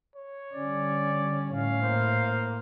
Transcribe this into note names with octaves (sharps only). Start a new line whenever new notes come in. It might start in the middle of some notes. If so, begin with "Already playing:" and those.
C#5
D3 G3 C#4 D5
A2 C#4 F5
A#3 C5